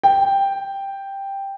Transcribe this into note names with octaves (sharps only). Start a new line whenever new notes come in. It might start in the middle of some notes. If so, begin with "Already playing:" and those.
G5